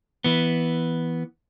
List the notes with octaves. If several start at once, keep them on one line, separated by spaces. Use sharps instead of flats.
E3 B3